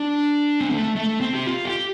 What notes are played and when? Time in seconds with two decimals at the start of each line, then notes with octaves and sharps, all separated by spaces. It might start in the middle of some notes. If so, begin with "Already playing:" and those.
Already playing: D4
0.61 C4
0.71 A3
0.96 A3
1.20 C4
1.34 G4
1.47 F4
1.65 G4